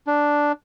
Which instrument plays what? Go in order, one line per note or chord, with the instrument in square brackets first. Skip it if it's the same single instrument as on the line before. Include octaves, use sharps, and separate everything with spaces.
[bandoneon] D4